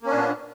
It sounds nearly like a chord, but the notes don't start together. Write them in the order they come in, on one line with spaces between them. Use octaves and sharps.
A#3 C#4 D4 A#2 B3